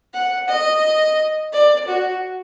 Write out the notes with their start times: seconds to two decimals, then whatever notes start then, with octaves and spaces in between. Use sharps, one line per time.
0.14 F#5
0.49 D#5
1.53 D5
1.88 F#4